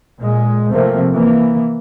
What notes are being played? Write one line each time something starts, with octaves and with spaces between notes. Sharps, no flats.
A#2 G#3
C3 F3 A3 A#3 C4
E3 A#3